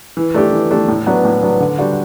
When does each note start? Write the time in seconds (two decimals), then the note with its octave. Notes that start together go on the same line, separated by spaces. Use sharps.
0.17 E3
0.34 A3 D4 G4
0.52 E3
0.71 A3 D4 G4
0.88 A2
1.06 F#3 B3 D4
1.25 A2
1.42 F#3 B3 D4
1.60 D3
1.78 G3 D4 F#4